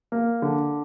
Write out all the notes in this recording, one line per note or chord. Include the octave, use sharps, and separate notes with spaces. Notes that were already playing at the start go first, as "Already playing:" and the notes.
A#3
D3